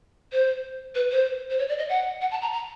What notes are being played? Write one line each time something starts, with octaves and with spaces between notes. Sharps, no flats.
C5
B4
C5
C5
C#5
D5
D#5
F#5
F#5
A5
A#5
A#5